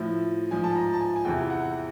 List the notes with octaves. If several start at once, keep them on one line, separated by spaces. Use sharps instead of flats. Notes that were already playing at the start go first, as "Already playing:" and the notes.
Already playing: A2 F3
G#2 F3 G#5
A5
A#5
A5
G#5
G#5
E2 C3 E3 G5
F#5